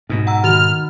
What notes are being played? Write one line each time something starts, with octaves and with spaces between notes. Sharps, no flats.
G#2 B2
F#5 A#5 E6
D#3 F#4 F6